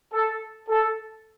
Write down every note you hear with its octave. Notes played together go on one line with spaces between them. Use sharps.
A4
A4